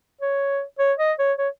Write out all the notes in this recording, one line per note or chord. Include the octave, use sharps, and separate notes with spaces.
C#5
C#5
D#5
C#5
C#5